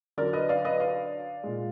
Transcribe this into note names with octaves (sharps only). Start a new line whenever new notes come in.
D3 F#3 A#4 D5
B4 D#5
D5 F5
B4 D#5
D5 F5
A#2 G#3